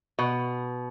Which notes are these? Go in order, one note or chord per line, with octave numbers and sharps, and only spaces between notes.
B2